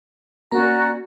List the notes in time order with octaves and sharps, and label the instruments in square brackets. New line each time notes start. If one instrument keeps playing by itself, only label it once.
[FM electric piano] A#3 A#5 [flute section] C#4 F#4 D5